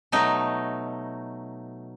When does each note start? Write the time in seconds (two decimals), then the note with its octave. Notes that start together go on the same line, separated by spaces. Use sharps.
0.12 B2 F#3 A3 D#4